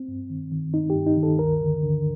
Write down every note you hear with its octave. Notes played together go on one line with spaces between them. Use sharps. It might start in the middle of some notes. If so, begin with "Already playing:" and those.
Already playing: C4
G2
D#3
D#3
G2 D#4
G4
G2
D#4
D#3
A4
D2 A#4
D3
D3